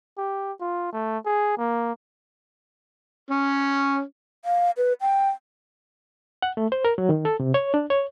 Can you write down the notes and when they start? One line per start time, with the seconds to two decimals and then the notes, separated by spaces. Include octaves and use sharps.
0.18 G4
0.61 F4
0.92 A3
1.25 G#4
1.58 A#3
3.30 C#4
4.45 F5
4.77 B4
5.01 G5
6.42 F#5
6.57 A3
6.72 C5
6.85 A#4
6.98 F#3
7.09 D#3
7.25 A4
7.40 C3
7.54 C#5
7.74 D4
7.90 C#5